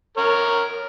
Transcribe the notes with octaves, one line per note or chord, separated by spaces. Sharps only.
A#4 C#5